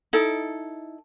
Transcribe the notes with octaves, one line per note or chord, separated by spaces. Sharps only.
D#4 E4 A4